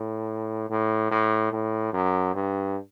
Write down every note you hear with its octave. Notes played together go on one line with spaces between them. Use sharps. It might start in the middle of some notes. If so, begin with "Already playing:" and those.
Already playing: A2
A2
A2
A2
F#2
G2